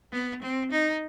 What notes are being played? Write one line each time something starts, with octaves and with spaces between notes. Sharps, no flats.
B3
C4
D#4